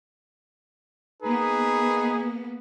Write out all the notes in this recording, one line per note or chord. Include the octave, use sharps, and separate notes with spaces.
A#3 B3 D#4 G#4 B4